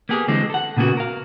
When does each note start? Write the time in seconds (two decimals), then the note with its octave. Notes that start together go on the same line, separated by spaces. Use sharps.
0.09 A#3 B3 G4 G#4
0.28 D3 E3 G3 G#3 C4
0.50 A4 F#5
0.77 A#2 C#3 A#3 B3 F#4
0.97 A#4 F5